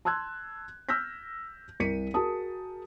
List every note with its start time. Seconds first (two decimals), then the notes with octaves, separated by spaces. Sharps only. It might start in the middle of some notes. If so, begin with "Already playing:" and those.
0.05 A5 C6 E6 F#6 G#6
0.89 E6 F6 G6 A#6 B6
1.80 C2 A#4 B6 C#7 D#7
2.14 F#4 G#4 A#4 A5 D#6